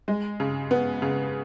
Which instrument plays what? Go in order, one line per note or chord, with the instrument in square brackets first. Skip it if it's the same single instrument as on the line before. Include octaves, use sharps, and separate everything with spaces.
[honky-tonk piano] G#3
C#3
B3
C#3